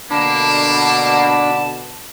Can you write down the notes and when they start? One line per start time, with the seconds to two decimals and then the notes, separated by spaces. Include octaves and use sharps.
0.11 B2 D3 A#3 D4 A5 B5